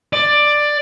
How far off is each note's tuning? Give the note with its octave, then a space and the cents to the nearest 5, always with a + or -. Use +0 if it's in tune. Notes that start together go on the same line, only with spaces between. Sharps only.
D5 +10